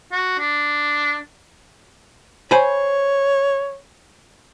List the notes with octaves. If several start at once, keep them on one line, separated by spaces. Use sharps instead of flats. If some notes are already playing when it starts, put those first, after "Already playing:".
F#4
D4
C5 C#5 G#5 B5